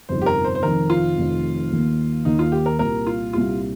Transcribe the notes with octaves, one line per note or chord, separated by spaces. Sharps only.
G1 F2 C3 F3 D#4 C5
G4
A#4
C5
C5
F1 F2 D#3 C4 D#4 A#4
F4
F1 F2 D#3 C4 D#4
D#2 D#3 A#3
D#2 D#3 A#3 D#4
F4
G4
A#4
C2 A#2 G3 A#4
F4
C2 A#2 G3 F4